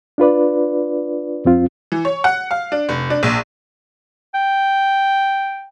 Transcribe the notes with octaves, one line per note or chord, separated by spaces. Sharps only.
D4 F4 B4 D5
F2 C4 F4
E3
C#5
F#5
F5
D4
F1
D4
A#1
G5